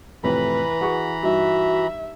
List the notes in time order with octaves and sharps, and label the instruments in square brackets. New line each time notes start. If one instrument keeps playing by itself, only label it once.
[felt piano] F2 A2 C3 [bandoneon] E3 A#5 B5 [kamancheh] B4
[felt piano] F#4 G#4 C#6
[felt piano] G2 D#4 [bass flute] F#4 [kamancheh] E5